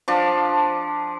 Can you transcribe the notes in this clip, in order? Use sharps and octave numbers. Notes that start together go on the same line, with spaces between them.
F3 D4